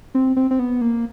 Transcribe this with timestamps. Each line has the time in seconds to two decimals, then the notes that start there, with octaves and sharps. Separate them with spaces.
0.15 C4
0.36 C4
0.51 C4
0.59 B3
0.81 A#3